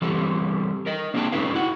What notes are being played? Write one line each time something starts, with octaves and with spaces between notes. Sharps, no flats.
E3 G3 C4 A4
A#4 D#5
A#3 C4 D4 G#4 G5 A5
A3 C#4 D#4 A4 B4 F5
E4 F#4 F#5